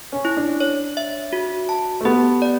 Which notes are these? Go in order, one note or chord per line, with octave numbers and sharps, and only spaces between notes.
C#4
E4
D4
C#5
E5
F#4
A5
A3
B3 G4
D5